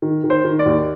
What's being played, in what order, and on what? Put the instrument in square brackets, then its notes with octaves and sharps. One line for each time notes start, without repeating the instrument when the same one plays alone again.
[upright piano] D#3
D#3
C5
D#3
D5
D#2